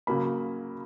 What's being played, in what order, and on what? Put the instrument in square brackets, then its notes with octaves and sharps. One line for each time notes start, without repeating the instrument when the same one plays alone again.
[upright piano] C#3 F#3 A#3 B5